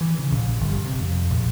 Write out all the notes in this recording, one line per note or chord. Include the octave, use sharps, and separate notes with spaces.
E3
C#3
A#1
G1
C3
F2
A#1